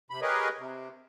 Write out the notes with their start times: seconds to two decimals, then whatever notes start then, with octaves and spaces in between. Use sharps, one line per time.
0.11 C3 B5
0.22 G4 G#4 A#4 B4 C#5 D#5
0.58 C3